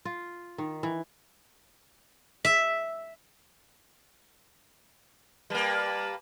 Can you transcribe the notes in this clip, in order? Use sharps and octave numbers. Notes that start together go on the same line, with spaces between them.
F4
D#3
E3
E5
G3 A#3 B4 A5